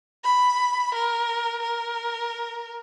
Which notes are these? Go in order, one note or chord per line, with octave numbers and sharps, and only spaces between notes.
B5
A#4
A#4